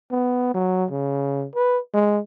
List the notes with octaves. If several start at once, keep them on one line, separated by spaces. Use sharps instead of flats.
B3
F#3
C#3
B4
G#3